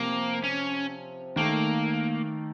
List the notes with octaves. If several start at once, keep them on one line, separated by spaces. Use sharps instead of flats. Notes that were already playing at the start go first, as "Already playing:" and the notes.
Already playing: C3 F3 A#3 C4
C#4
D#3 A3 A#3